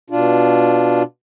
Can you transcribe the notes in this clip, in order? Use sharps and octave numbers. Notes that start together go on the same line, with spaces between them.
B2 D4 F4